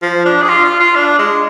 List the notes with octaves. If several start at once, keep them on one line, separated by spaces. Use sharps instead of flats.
F3
D4
G#4
F4
F4
F4
D4
G#3